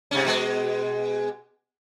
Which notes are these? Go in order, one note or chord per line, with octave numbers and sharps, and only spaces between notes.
G#2 C3 C#4
B2 G#3